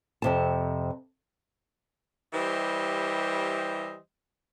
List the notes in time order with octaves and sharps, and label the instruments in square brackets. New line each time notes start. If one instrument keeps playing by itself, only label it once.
[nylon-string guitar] F2 C3 A5
[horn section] E3 G3 G4 C5 D#5 E5